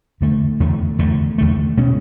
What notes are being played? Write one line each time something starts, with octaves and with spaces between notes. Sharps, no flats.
E2 D3 A3
E2 D3 A3
E2 D3 A3
E2 D3 A3
B2 G#3 C#4